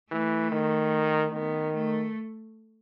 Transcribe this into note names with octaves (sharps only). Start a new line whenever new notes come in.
E3 A3
D#3
D#3 B3
A3